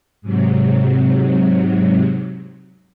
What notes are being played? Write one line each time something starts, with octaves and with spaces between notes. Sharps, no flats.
G#2 C3 F#3